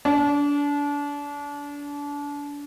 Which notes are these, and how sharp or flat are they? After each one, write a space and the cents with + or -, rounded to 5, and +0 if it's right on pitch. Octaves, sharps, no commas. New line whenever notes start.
D4 -30